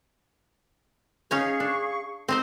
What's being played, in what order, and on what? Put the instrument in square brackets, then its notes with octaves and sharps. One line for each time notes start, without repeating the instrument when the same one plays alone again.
[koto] C#4 D#4 C#5 [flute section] G#4 F5 C#6
[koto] D4
C4 D#4 C5